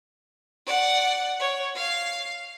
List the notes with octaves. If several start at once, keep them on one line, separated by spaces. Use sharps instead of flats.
D5 F#5
C#5
F5 C7